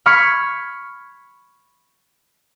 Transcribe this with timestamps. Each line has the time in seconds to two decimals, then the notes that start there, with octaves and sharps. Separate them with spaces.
0.06 B5 C#6 F6 G#6 B6 C#7